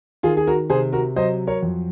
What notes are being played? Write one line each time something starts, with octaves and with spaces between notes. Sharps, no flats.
D#3 F4 G#4
G#4
F#4 A#4
C3 G#4 C5
F#4 A#4
F#3 C5 D#5
A#4 C#5
F2